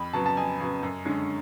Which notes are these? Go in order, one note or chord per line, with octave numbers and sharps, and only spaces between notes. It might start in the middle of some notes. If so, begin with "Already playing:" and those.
Already playing: F2 B5
C#3 F#3 B3 A5
A5
F2 G#5
C#3 F#3 B3
F#2
D3 G#3 C#4